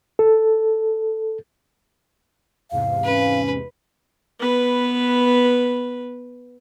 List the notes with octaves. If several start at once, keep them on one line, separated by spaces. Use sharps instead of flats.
A4
E2 G#2 C3 F5
C#4 B4
B3 B4